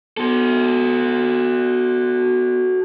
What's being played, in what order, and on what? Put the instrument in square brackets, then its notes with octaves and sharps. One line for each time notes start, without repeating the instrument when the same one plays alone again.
[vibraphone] B3 C6 [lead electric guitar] F#4 A4